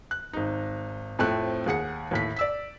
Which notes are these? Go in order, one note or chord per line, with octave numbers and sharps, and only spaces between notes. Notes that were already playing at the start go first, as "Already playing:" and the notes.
F#6
G#1 D#4
F2 A2 A3 C4 F#6
D#2 G#4 F#5 C#7
D#2 A2 B6
D5 E6 B6